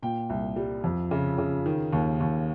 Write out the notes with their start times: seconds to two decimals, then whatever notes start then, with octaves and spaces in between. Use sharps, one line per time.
0.03 A#2 G5
0.30 C2
0.56 G3
0.84 F2
1.11 C#3
1.38 C#3
1.66 D#3
1.93 D#2
2.20 D#2